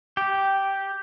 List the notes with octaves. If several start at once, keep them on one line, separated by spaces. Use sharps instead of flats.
G4